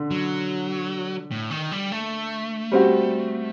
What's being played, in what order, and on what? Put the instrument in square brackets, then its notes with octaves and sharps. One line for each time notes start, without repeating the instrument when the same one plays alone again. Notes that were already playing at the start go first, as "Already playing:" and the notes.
Already playing: [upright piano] D3
[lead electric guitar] F#3
A2
D#3
G3
A3
[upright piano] G3 C4 F#4